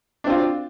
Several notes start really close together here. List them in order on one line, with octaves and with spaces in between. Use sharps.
D4 C4 F4